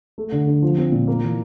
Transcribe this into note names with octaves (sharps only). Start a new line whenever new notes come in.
A3
D3
D3
F3
C4
A#2
A#3
E3